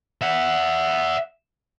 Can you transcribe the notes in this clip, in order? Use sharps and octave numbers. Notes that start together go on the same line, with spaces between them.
E5 F#5